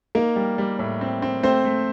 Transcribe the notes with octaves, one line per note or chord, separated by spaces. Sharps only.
A#3 D#4 A#4
G3
G3
A2
C4
C4
A3 C4 C5
A3